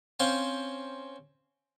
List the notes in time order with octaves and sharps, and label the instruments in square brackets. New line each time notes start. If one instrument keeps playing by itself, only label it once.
[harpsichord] C4 C#4 C5 F5 C6